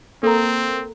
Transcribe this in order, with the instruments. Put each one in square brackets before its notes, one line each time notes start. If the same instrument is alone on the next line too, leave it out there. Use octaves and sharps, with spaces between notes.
[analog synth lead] A#3 [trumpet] C4 [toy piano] A4 A#4 A#5